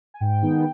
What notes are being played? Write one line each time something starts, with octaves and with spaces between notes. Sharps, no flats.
G#5
G#2 G5
D#3 G#3 B3 D#4